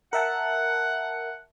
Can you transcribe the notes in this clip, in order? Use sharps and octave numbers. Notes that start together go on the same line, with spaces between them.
A#4 E5 F#5 A5